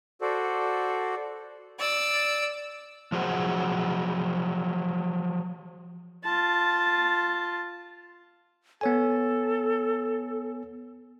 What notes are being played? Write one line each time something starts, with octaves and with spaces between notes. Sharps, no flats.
F#4 A4 C5 D5
D5 E6
F3 F#3 G#4 C5 F#5
F4 A5
B3 A4 C#5 G#5